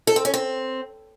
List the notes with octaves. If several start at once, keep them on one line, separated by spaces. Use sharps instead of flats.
A4
C4
C#4
C4